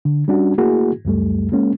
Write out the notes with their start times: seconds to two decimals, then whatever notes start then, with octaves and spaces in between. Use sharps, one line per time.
0.05 D3
0.28 G3 C#4 D4 F#4
0.58 A3 A#3 E4 F#4 G#4
1.05 C#2 F#2 G3 A3
1.52 G#3 A#3 C#4